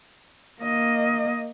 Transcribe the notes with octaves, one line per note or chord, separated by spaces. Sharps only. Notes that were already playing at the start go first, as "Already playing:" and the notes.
A#3 D#5